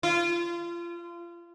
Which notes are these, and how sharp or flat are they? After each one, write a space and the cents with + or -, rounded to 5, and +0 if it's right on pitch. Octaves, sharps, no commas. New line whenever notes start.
F4 -30